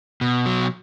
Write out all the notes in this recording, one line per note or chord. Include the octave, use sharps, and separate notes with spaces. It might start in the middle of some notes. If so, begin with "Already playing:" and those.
B2
F#3